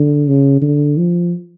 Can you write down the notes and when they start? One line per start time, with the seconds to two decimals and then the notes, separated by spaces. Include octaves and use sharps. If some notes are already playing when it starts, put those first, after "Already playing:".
Already playing: D3
0.27 C#3
0.62 D3
0.98 F3